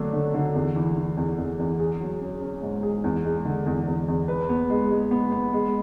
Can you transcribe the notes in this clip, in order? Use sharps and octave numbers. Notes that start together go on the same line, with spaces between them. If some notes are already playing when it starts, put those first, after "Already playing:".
Already playing: D3 F#3 A3 D4
D3
D3
E2
E3
E3
E2
E2
E2
G#4
F#3
C#4
C#4
G#2
G#4
E2
G#3
D3
E2
E2
E2
B4
B3
G#3
G#3
B3
B3
G#3